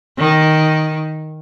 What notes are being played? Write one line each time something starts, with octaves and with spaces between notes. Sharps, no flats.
D#3